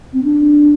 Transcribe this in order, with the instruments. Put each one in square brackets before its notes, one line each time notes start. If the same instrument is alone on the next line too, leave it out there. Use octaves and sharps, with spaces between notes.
[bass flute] C4
D4